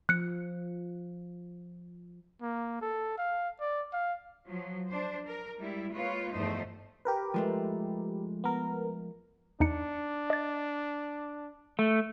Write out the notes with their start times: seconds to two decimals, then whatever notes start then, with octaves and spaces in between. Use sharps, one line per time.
0.09 F3 F#6 C#7
2.42 A#3
2.81 A4
3.18 F5
3.61 D5
3.93 F5
4.48 F3 F#3
4.88 D4 C5
5.26 A#4
5.59 G3 G#3 E4
5.92 G#3 A#3 F4 B4 C#5
6.34 E2 G2 F3 A3 D#4 C5
7.05 G4 A#4 B4
7.34 F3 G#3 A3
8.44 B3 A#4
9.60 E2 D4 D#4 C#7
10.30 D#5 A6
11.79 A3